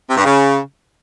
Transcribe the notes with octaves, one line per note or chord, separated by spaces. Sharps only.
C3
G2
C#3